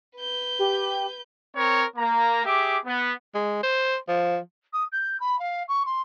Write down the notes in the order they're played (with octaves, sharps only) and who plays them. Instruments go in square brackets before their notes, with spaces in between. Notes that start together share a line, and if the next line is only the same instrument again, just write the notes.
[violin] B4 G6
[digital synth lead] G4
[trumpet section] C4 A#4 C#5
A#3 A#5
G4 G#4 E5 D6
B3
[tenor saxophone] G#3
C5
F3
[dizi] D#6
G6
B5
F5
C#6
C6